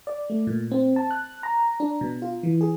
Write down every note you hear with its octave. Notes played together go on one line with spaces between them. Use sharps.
D5
A3
A#2
C4
A5
F#6
A#5
D4
B2
F4
E3
G#4